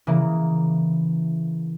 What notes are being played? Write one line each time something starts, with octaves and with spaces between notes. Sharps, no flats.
C#3 E3 A#3